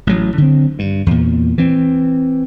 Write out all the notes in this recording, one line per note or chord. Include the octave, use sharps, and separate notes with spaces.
A1 F#3
D3 C4
G2
E2 A#2
E3 C4